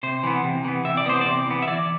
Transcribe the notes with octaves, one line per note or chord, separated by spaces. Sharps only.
C3 C5
E3 B3
C3
E3 B3
C3 E5
D5
E3 B3 C5
C3 D5
E3 B3
E5
E3 D5